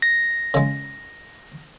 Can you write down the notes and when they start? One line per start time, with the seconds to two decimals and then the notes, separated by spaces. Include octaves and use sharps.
0.02 A#6
0.54 C#3 G#3